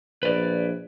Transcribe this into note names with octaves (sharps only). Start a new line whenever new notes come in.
A#1 B4 D5